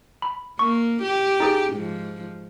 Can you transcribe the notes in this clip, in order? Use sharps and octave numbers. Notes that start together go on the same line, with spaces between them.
B5
A#3 C#6
G4
D#4 G#4
G#2 F3